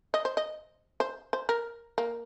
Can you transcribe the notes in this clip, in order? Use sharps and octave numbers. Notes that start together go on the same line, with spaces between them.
D#5
C5
D#5
C5
C5
A#4
A#3